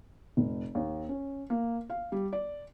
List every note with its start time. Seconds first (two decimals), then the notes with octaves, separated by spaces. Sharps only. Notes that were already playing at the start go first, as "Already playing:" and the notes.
0.37 F1
0.75 D#2
1.09 C#4
1.50 A#3
1.90 F5
2.12 G3
2.33 D5